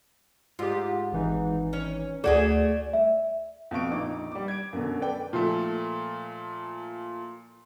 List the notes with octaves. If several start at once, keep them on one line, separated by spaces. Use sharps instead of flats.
G#2 F4 G4
G#1 E3 D#4
C#4
D2 A3 F#4 G#4 D5 G#6 E7
E5
F2 B2 F5 C#6 D7
A#1 D#4 D6
G3 D6
G#6 D7
F#2 B2 D3
A4 B4 D5 G5
A#2 F3 A3